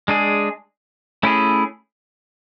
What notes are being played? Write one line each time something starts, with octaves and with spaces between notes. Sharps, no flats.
G#3 D4 G#4
A3 C#4 E4 G#4